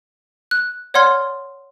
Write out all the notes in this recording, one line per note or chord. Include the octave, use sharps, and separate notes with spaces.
F#6
C#5 D5 F#5 C6 F6 G#6